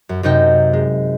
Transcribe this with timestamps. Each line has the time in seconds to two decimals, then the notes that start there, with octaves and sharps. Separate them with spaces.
0.09 F#2
0.23 F#2 C3 D#4 D#5 G5
0.73 G#3